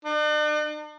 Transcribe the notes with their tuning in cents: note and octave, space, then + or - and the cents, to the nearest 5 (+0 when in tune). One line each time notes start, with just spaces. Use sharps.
D4 +45